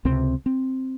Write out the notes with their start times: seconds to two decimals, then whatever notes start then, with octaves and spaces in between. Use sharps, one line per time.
0.05 C#2 C3 C4
0.46 C4